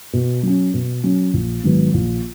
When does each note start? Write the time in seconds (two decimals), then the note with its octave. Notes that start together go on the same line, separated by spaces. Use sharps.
0.13 B2
0.43 F#3 C#4
0.74 B2
1.04 F#3 C#4
1.33 A#1
1.64 G#2 D#3 F#3 B3
1.94 A#1